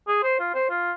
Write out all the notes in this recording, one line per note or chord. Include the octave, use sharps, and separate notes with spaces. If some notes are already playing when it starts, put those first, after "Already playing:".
G#4
C5
F4
C5
F4